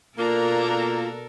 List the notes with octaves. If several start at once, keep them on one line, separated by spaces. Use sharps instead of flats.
B2 A#3 D4 F4 A4 A#4 A#5